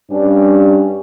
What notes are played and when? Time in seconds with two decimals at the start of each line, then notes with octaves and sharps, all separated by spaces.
0.11 G2 G3 C#4 D4